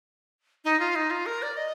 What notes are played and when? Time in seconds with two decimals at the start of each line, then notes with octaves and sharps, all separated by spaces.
0.65 D#4
0.80 F4
0.95 D#4
1.11 F4
1.26 A#4
1.42 D5
1.57 D#5